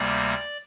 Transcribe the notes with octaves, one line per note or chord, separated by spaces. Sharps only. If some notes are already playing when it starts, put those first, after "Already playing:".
Already playing: D2 C3 G3 A#3 D5